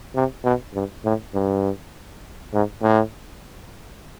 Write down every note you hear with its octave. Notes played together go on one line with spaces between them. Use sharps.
C3
B2
G2
A2
G2
G#2
A2